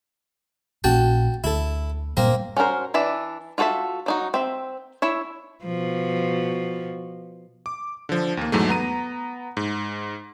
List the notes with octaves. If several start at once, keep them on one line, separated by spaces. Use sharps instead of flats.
A#1 A#2 C#4 F#4 G5 A5
D2 E4 A4
G2 A#2 G3 A#3 C4 A#4
C#4 F#4 A4 A#4 C5
E3 D4 E5
F4 F#4 A4 C5 E5
F#3 D#4 F#4
C4 E5
E4 C#5 E5
B2 F3
D6
D3 F3
D#2 A#3
E2 G#2 F#3 A3
B3 A#5 D#7
G#2